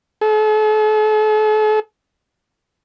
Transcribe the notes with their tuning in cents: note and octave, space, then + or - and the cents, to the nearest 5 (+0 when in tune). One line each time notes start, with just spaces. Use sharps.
A4 -40